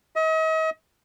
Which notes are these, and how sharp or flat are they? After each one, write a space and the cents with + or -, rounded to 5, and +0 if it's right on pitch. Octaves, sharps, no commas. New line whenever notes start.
D#5 +40